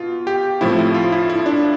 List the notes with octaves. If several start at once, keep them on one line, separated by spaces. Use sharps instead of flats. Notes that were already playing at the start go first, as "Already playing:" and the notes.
Already playing: B2 F4
G4
A2 F3 A3 C4 E4
E4
F4
E4
E4
D4